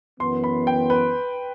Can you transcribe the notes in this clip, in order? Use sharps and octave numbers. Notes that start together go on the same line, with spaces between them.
F#2 E3 B3 C6
B5
G5
B4